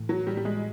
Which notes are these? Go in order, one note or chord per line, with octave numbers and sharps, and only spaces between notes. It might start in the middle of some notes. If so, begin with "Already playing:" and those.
Already playing: A2 E3 A3
F#3
G3
G3
G#3